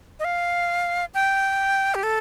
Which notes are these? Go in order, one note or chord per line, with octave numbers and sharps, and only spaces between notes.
D#5
F5
G5
G4
A4